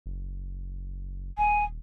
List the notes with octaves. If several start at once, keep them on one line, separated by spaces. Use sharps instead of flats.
F#1
D#1 G#5